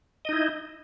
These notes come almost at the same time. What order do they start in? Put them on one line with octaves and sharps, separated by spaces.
D#5 D#4 E4